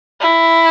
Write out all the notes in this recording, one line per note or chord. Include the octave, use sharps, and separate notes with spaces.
E4